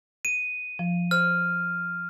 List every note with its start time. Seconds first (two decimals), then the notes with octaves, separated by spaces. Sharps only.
0.25 D#7
0.79 F3
1.11 C5 F6